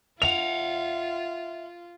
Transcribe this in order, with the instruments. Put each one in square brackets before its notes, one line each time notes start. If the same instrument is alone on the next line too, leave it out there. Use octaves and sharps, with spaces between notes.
[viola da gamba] F4 [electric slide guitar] E5 F#5 [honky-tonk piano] F7